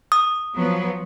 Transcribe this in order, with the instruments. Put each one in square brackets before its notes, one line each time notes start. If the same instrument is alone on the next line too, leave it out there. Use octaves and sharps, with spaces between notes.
[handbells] D#6
[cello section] F3 F#3 B3